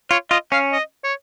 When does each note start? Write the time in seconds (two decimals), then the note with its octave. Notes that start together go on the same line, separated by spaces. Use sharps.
0.11 F4 C#5
0.31 F4 D#5
0.52 C#4 F5
0.73 D#5
1.04 C#5